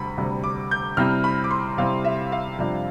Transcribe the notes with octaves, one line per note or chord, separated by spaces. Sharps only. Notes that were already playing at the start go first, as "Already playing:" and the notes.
Already playing: D2 C3 G3 B5
D2 C3 G3
D6
G6
C3 G3 C4 E4 F6
B5
D6
C6
C3 G3 C4 E4 F5
E5
F5
F2 C3 G3 D4